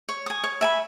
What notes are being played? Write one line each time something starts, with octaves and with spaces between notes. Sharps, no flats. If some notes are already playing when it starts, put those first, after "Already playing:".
C#5
G#5 D#6
C#5
E5 G#5 B5